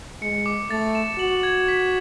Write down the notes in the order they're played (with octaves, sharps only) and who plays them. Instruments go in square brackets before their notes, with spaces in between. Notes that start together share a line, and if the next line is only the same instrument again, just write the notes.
[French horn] G#3 [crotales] C#7
[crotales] D6
[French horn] A3 [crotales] A6
[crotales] E7
[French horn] F#4 [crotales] F#7
[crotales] G#6
B6